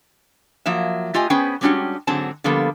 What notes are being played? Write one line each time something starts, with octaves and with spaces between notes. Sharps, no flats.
F3 F#3 A#3 E5
A3 F4 G4 D#5 G#5
B3 C#4 G#4 B4 C5 G5
G3 G#3 C#4 D4 F#4 G4
G#2 D3 F#3 C4 G#4 A5
D3 F3 G3 A#3 B3 A4